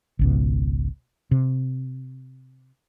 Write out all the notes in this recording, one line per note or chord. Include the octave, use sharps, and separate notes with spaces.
G#1 C#2 B2
C3